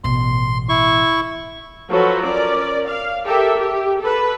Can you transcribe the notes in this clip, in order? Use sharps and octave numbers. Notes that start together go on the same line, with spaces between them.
A1 B2 C6
E4 C#6
F3 F#3 F#4 A4 B4
C#4 A#4 D5
F5
G4 A4 A#4 E5
G4
A4 B4